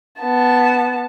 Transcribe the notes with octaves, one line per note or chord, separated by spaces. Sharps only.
B3 A5